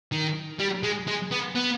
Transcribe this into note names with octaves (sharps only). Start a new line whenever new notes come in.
D#3
G3
G#3
G#3
B3
B3